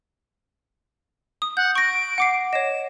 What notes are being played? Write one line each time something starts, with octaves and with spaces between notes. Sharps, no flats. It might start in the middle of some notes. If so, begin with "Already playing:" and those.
D#6
F#5 G6
C#6 A#6 D7
F#5 D6 C7
C#5 D#5 E7